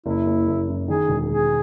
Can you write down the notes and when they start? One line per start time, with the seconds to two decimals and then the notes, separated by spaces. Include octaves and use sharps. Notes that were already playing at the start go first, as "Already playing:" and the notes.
0.06 F#1 E4
0.26 F#1
0.47 F#1
0.69 F#2
0.88 D#3 G#4
1.09 E1
1.30 E1 G#4